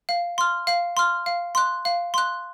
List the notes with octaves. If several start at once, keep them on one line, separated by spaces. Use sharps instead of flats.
F5
C6 F6
F5
C6 F6
F5
C6 F#6
F5
C6 F#6